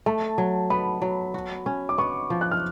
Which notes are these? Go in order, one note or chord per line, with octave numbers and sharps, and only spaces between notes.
A3 A5
F#3
B3 B5
F#3
F#4
C#4
D6
B3 C#6
F3
F#6
F6